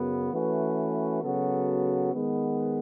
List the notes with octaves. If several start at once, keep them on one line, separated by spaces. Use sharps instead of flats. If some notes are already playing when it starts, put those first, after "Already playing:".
Already playing: F#2 C#3 F#3 B3
E3 A3 C#4 F#4 B4
C#3 F#3 B3 F#4 A4
D#3 G#3 B3